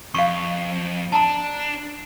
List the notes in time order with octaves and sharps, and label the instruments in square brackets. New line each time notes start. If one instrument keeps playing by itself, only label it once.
[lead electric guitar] F2 [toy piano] F5 C#6
[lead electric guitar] D4 [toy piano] A5 A#5